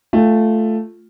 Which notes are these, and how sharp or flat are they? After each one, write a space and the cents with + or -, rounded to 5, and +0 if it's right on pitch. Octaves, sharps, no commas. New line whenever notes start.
A3 +0 F4 +0 G5 +40